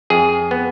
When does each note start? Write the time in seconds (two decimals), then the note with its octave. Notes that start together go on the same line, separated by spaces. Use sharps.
0.10 F2 G#4
0.51 B3